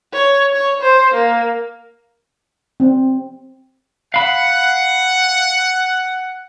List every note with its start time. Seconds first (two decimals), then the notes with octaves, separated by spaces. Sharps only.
0.13 C#5
0.53 C#5
0.81 C5
1.14 A#3
2.80 C4
4.14 F5 F#5 B5